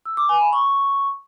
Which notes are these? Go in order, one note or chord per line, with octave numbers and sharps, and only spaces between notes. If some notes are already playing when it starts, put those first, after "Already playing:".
E6
D6
G#5
B5
C#6